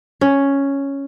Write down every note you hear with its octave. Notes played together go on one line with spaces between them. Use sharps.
C#4